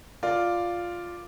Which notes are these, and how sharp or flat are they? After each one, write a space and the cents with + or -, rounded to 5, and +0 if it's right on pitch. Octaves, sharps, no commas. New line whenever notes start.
F4 +0 A#4 +0 D5 +0